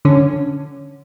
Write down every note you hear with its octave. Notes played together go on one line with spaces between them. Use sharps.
D3 C#4